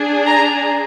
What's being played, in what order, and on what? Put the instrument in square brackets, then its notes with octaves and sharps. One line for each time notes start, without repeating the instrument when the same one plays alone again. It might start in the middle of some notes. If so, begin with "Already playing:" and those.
Already playing: [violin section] D4 G#4
A#5